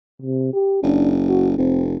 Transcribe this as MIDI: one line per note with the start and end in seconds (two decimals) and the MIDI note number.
0.22 0.49 48
0.53 0.80 67
0.83 1.53 30
0.83 1.12 62
1.28 1.48 66
1.58 1.98 29
1.58 1.84 60